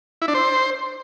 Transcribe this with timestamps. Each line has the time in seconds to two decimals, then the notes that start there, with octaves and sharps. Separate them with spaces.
0.22 E4
0.28 D4
0.34 C5